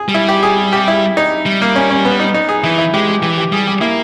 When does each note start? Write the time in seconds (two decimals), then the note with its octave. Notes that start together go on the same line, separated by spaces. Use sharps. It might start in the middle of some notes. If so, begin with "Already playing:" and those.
Already playing: G#4
0.08 G3
0.14 E4
0.28 G4
0.43 G#4
0.73 G4
0.88 E4
1.17 D#4
1.46 G3
1.62 A#3
1.76 C#4
1.90 C#4
2.05 B3
2.20 D#4
2.34 D#4
2.49 G#4
2.64 E3 E4
2.78 E4
2.94 G#3 G4
3.08 G4
3.22 E3 G4
3.38 G4
3.52 G3 G#4
3.67 G4
3.81 A#3 E4